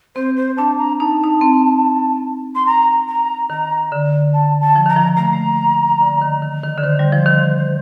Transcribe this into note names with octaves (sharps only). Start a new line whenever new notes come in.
C4 C5
C5
D4 A5
A#5
D#4 A5
D#4
C4
C6
A#5
A#5
D#3 A#5
D3
A5
A5
F3
D#3 A#5
F3
A3 A#5
A#3
A3
D3
D#3
D#3
D#3
D3
D#3 C5
G3
F3
D#3